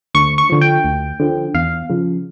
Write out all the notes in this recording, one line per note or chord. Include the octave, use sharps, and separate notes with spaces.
D2 C#6
C#6
D3 F3
G5
D2
D3 F3
E2 F5
C#3 F3